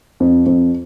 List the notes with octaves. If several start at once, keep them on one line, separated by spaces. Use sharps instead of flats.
F2
F2